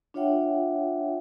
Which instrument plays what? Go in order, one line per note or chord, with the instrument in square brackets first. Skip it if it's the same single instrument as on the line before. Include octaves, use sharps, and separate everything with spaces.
[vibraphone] D4 F4 C#5 E5 F#5 G5